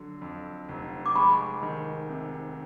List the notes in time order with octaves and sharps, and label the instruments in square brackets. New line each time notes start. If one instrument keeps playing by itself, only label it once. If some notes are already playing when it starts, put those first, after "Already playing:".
Already playing: [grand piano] D3 F#3
F2
F1
[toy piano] D6
[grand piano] G#3 [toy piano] B5 C#6
[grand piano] D#3
C3